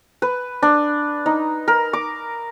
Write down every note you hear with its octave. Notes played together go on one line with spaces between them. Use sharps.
B4
D4
D#4
A#4
D6